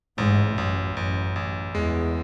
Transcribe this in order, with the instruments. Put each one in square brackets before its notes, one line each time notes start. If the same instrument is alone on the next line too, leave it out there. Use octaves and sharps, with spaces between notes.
[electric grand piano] A1 [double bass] G#2
[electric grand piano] A1 [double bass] F#2
[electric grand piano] A1 [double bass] F#2
[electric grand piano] A1
[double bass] E2 [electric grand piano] G#3